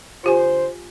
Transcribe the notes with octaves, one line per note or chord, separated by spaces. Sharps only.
D3 F4 G4 C5 G#5